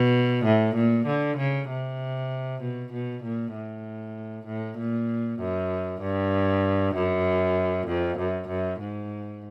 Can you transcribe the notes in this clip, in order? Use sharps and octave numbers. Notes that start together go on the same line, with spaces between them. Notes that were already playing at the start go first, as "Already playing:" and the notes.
Already playing: B2
A2
A#2
D3
C#3
C3
B2
B2
A#2
A2
A2
A#2
F#2
G2
F#2
F2
F#2
F#2
G#2